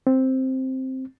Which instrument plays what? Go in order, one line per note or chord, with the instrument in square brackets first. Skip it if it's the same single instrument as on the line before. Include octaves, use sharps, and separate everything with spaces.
[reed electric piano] C4